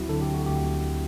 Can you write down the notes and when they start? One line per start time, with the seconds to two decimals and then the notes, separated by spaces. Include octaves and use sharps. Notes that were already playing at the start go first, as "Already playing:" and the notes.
Already playing: D2 F#3 C4 E4 F#4
0.09 D3 A4
0.22 G4
0.34 F#4
0.46 D2 G4